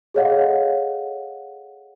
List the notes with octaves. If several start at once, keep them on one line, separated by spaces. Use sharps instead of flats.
G#4 A4 C#5 D#5 F5 F#5